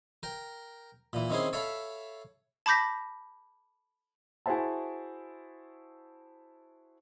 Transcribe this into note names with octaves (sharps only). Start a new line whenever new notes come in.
A#4 G5
A#2 E3
D#3 C4 C#4 E4 G#4 C6
A4 C#5 E5 F5 A5 B5
A5 B5 D6 G6 A#6 B6
E4 F#4 G#4 C5 E5 A5